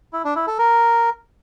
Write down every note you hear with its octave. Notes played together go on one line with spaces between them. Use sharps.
E4
D4
E4
A4
A#4